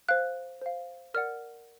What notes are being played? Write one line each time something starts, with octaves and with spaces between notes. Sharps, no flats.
C5 F5 F#6
C5 F5
A#4 D5 F#5 F6